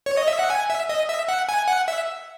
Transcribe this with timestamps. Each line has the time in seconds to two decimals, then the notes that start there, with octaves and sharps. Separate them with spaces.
0.06 C#5
0.17 D#5
0.28 E5
0.39 F#5
0.50 G#5
0.70 E5
0.89 D#5
1.09 E5
1.28 F#5
1.49 G#5
1.68 F#5
1.88 E5